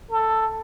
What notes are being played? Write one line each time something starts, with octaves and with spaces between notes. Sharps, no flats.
A4